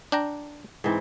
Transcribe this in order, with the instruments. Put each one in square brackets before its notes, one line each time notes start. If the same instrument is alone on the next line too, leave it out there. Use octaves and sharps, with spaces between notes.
[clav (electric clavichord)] D4 G5 A#5
[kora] G#2 E3 C4